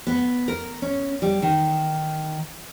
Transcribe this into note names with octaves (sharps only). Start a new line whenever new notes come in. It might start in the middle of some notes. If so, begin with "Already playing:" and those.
B3
A#4
C#4
G3
D#3